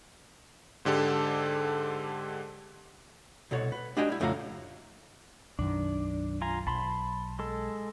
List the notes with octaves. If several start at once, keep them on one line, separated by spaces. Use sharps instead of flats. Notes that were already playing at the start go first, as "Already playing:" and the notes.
G#2 D3 G4 A4
C2 B2 F#4 A4 C#5
B4
D4 F#4 G4 D#5 G5 G#5
G3 E4
F2 A2 C#3 F#4 F5 A#5
B1 F#2 D#3 D4
F4 G#5 A#5
B1 A5 B5 C6
G#3 A4